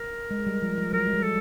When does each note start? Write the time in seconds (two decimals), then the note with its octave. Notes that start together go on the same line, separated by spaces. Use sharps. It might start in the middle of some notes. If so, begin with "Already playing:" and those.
Already playing: A#4
0.31 G#3
0.47 G3
0.62 F3
0.78 F3
0.93 F#3 A#4
1.07 G#3
1.14 G3
1.23 A4